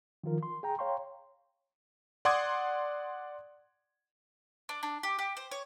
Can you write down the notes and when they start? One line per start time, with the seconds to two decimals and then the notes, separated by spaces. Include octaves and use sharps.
0.24 D#3 F3 F4 A#4
0.43 C6
0.63 G#4 G5 A#5
0.79 C#5 F5 G5 A#5 C6 C#6
2.25 D5 F#5 C6 D6 D#6 G#6
4.69 D4
4.83 D4
5.03 G4
5.19 G4
5.37 C5
5.51 C#5